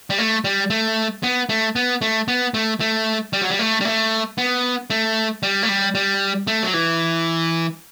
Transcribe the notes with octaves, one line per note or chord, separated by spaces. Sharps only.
G3
A3
G3
A3
B3
A3
B3
A3
B3
A3
A3
G3
F#3
G3
A3
G3
A3
B3
A3
G3
A3
G3
G3
A3
F#3
E3